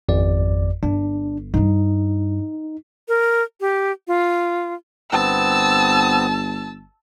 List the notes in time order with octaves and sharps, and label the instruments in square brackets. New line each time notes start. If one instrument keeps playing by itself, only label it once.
[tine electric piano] G#1 F2 D5
[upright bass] G1 [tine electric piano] D4
[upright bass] G2 G3 [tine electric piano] D#4
[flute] A#4
G4
F4
[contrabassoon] G1 [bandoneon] B3 C4 [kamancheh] A5 [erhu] E6